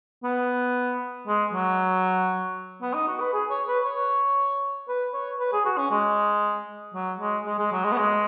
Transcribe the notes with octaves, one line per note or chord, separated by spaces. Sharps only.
B3
G#3
F#3
B3
D#4
F#4
B4
G#4
C#5
B4
C#5
B4
C#5
B4
G#4
F#4
C#4
G#3
F#3
G#3
G#3
G#3
F#3
G#3
B3
G#3